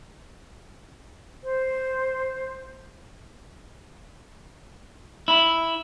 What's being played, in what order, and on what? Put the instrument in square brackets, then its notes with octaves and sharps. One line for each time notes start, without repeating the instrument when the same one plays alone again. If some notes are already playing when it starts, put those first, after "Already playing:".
[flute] C5
[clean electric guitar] E4